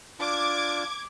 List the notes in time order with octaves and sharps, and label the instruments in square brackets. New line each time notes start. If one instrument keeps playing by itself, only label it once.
[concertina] D4 F4 A5 [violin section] D6 G#6